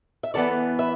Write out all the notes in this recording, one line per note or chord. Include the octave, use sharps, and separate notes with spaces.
E5
E2 E3 B3 A4 D5
B4 E5